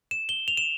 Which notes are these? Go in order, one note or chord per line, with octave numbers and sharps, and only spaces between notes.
E7
G7
F7
E7